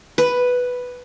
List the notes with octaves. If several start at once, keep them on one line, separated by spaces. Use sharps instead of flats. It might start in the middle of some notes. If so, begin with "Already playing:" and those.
B4